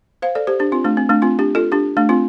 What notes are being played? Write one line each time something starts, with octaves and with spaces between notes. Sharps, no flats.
C5 F5
A4 D5
G4 C5
D4 G4
C4 F4
A3 D4
C4
A3 D4
C4 F4
D4 G4
F4 A4
D4 G4
A3 D4
C4 F4